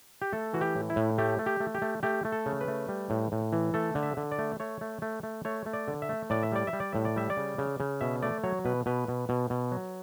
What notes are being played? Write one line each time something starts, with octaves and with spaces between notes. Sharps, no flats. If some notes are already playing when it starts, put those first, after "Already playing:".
G4
A3 A4
E3 F#4
G4
A2
E4
A2
A3 G4
A3
G4
A3
G4
A3
A3 G4
A3
A4
C#3
B4
A3
G3
A2
A2
E3
A3 A4
D3
E5
D3
D5
A3
A3 C#5
A3
A3
A3
A3 C#5
A3
D5
D3
E5
A3
A2 D5
E5
G3 D5
E5
G3
D5
A2 E5
D5
G3 E5
D5
C#3
C#3
C#3
B2 E5
A3 D5
F#3 C#5
B2 B4
B2 B4
B2
B2
B2
F#3